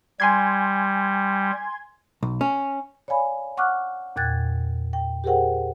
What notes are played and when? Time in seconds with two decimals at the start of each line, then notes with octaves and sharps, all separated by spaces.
0.20 G3 G#5 C6 G#6
2.23 B1
2.41 C#4
3.08 C#5 D5 F5 G#5 B5
3.57 F#5 C#6 D6 F6 F#6
4.16 E2 A#2 G5 F#6 G#6 A6
4.93 G5
5.24 G4 G#4 A#4 C5 F#5 G5